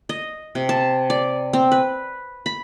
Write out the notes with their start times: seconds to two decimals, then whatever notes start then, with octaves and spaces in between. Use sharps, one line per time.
0.09 D#5
0.55 C3
0.69 A5
1.10 D5
1.53 C4
1.71 B4
2.46 B5